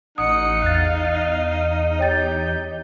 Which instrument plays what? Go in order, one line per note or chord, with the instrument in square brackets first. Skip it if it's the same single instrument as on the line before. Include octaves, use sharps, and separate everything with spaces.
[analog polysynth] A1 C#7 [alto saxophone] D#4 [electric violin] F#5 [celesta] D#6
[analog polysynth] E2 [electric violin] F5 [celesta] F#6 A6
[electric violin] G4 G6 [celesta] C#5 G5 A6